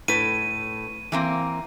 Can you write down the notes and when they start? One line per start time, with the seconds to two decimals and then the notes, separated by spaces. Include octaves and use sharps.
0.08 A2 B4 D#7
1.12 E3 A#3 C4